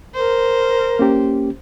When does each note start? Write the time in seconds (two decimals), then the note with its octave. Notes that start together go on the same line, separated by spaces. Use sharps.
0.14 A#4 C5
0.99 A#3 C#4 G4